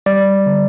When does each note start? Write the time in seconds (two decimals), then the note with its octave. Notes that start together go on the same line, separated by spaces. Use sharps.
0.06 G3 D5
0.46 D3